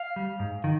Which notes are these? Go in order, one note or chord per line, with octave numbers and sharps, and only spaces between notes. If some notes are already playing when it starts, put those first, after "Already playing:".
Already playing: F5
G3
G#2
D#3